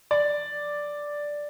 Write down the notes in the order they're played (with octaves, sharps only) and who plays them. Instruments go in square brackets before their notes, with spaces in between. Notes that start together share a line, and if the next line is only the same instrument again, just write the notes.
[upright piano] D5